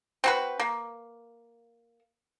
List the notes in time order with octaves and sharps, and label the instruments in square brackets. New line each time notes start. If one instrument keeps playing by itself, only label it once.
[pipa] C4 F#4 B4
A#3